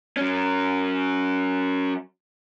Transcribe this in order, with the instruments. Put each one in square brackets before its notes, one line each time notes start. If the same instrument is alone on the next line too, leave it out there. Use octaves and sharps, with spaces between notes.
[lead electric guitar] F#3 C#4